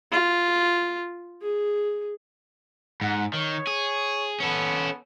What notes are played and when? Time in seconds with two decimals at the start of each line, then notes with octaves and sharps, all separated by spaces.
0.12 F4
1.41 G#4
3.01 G#2 F#5
3.34 D#3 C#5
3.67 G#4
4.40 B3 C#4 A4